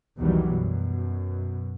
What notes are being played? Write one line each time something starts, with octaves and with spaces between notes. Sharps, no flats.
B1 E2 D#3 E3 F#3 G3
F#2 B2